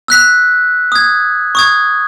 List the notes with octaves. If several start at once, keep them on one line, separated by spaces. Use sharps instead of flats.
E6 F#6 B6
D#6 G#6
C#6 D#6 G#6